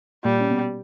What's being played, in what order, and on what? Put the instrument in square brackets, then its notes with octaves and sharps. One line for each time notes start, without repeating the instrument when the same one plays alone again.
[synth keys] A#2 A#3 [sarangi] G3
[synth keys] C#4
B2 B3